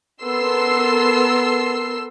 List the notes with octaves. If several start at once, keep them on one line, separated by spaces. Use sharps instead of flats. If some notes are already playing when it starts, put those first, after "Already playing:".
B3 A4 A#4 C6 E6 C7